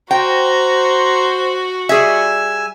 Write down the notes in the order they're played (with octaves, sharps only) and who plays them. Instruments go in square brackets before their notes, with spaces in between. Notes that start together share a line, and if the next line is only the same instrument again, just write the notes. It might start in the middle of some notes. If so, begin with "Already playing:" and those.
[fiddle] F#4 [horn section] C5 [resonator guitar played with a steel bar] G5 [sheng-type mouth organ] A#5
[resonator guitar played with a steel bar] G3 G#4 E5 [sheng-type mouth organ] G#5 E6